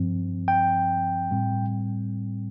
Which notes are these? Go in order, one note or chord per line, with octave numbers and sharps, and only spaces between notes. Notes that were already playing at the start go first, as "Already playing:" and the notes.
Already playing: G2 F3 C4
G5
A2 G3 C4